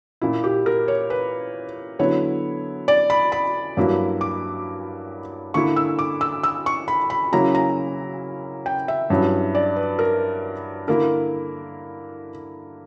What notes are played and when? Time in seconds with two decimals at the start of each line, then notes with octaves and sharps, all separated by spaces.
0.21 A#2 A#3 E4
0.44 G4
0.66 A#4
0.88 C#5
1.10 B4
1.99 D3 F#3 B3 E4 C#5
2.88 D5
3.10 B5
3.32 B5
3.77 G2 F#3 A#3 E4
4.21 D6
5.54 D3 A#3 E4 C#6
5.76 E6
5.99 D6
6.21 E6
6.43 E6
6.66 C#6
6.88 B5
7.10 B5
7.32 C#3 F#3 A#3 C#4 E4 A#5
7.55 A#5
8.66 G5
8.88 E5
9.10 G2 F#3 C#4 E4
9.55 D5
9.76 B4
9.99 A#4
10.88 D3 A#3 E4 A#4